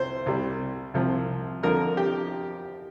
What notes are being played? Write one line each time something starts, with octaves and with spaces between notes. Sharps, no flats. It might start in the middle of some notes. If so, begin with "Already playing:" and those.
Already playing: C2 C5
C2 C3 G3
C2 C3 F3
F2 D3 F3 A#4
G4